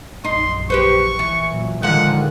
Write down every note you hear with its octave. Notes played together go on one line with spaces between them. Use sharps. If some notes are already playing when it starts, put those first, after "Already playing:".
A#1 F#2 D#4 C6
G4 B4 C5 C#6
E3
A#2 F#3
A2 D3 D#3 F3 G#3 F#5